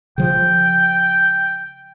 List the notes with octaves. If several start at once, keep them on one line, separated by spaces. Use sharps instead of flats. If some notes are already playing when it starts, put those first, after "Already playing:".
C#3 F3 G5